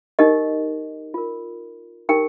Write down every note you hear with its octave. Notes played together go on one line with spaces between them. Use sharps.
D#4 G4 A#4 D#5
F4 A#4
D#4 G4 A#4 G5